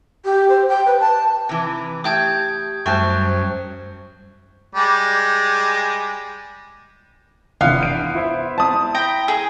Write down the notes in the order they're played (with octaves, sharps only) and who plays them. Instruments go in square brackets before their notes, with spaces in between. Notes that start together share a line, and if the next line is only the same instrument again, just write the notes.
[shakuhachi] G4
C5
G5
B4
A5
[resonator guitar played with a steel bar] C3 E3
[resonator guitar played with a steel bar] A3 G5 A5 [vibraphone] G4 [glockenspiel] D#6 G6 G#6
[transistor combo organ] F#2 [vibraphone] G3 C5 [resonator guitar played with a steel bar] A3 G5 A5 [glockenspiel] C#6 F#6
[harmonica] G3 G#3
[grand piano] F1 D3 E3 [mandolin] B3 [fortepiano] F5
[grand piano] G6 D7
E4 C5 E5
[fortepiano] A5 D#6
[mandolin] G5 A#5 B5
G#4